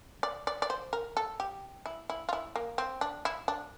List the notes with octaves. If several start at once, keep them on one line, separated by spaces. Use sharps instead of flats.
D5
D5
D5
C5
A#4
A4
G4
E4
E4
F4
E4
A#3
C4
D4
E4
D4